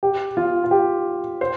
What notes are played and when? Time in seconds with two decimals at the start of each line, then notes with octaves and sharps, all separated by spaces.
0.03 G4
0.37 F4
0.64 F4
0.71 G4
1.41 C5